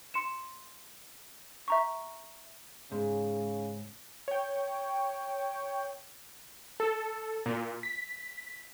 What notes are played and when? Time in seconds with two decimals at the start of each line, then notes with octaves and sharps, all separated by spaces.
0.14 C6 C#7 E7
1.68 E5 A#5 C#6
2.92 G#2 C#3
4.28 C#5 G5
6.80 A4
7.46 A#2
7.83 B6